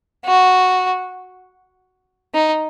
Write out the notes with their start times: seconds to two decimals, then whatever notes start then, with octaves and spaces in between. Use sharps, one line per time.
0.25 F#4
2.35 D#4